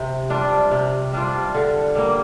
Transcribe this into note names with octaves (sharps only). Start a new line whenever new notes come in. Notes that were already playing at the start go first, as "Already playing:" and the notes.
Already playing: C3
G3 D4 F4
C3
G3 D4 F4
D3
G3 A#3